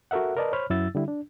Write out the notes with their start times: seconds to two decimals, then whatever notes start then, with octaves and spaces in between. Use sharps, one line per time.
0.11 F#4 A4 A#4 E5 F#5
0.37 A#4 B4 D5 D#5 A5
0.53 C5 C#5 B5 F6
0.70 F#2 F#3 E4 E6 A6
0.95 D3 G3 E4
1.08 D4